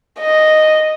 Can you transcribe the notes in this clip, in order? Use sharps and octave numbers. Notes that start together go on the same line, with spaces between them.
D#5